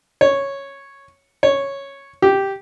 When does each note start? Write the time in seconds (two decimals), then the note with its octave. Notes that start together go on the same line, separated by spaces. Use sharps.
0.21 C#5
1.43 C#5
2.22 G4